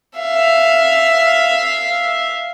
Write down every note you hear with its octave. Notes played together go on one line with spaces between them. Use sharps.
E5 F5